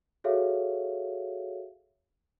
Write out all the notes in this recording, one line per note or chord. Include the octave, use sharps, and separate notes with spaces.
F#4 G#4 A4 C#5 E5 F5